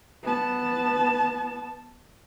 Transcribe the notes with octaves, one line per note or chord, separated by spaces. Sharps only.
B3 A5